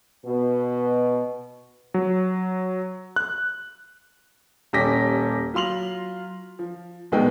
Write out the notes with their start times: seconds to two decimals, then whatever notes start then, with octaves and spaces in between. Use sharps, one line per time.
0.24 B2
1.94 F#3
3.16 F#6
4.73 D#1 C#4 G4 D6 A#6 B6
5.54 F#3 F4 C6 F7 F#7
6.59 F3
7.12 A#1 B2 G#3 B3 D#4 G5